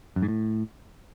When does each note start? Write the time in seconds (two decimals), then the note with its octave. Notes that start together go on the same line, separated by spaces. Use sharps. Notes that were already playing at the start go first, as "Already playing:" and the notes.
0.16 F#2
0.22 G#2
0.28 A2